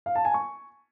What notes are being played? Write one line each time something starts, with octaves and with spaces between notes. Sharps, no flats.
F5
A5
G#5
C#6